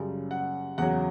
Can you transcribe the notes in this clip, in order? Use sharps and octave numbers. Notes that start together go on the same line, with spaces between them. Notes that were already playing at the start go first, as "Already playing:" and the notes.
Already playing: F#2 C#3 G3
F#5
E2 C#3 F#3 F#5